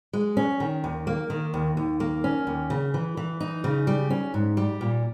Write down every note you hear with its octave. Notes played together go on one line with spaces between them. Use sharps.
G#3
C#4
D#3
D#2
A#3
D#3
D#2
D#2
A#3
C#4
D#2
C#3
E3
E3
D#4
C#3
G3
C#4
G#2
G3
A#2